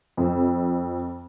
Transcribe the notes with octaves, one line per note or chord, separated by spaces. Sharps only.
F2